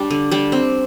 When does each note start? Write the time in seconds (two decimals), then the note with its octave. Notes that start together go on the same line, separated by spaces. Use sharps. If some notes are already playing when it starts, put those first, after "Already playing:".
Already playing: G3 D4
0.11 D3
0.31 G3 D4
0.52 C4